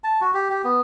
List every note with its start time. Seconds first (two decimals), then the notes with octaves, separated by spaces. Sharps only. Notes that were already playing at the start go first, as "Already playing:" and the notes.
0.04 A5
0.21 F#4
0.34 G4
0.50 G4
0.64 B3